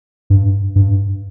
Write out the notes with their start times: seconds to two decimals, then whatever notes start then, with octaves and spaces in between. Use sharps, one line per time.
0.30 G2
0.76 G2